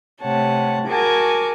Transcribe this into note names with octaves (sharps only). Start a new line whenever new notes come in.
C3 A3 C#5 F#5 A5
F#4 G#4 A#4 G#5 A5 D6